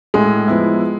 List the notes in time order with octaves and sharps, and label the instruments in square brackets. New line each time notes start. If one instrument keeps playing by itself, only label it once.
[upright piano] A2 [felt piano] G#3
[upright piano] F3 B3 E4